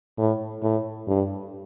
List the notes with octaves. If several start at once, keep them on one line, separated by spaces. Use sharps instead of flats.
A2
A2
G2